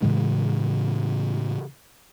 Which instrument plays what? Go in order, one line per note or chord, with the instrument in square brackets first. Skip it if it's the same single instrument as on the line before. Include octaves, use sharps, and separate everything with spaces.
[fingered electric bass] A2 C#3 E3 G#3